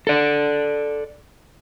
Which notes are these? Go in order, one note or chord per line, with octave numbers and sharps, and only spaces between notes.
A4 D5